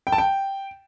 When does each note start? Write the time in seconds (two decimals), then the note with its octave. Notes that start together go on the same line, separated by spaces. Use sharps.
0.07 G5
0.12 A5
0.18 G5